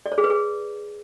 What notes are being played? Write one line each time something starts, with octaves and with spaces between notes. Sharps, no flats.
D5
C#5
G#4
B4
G#4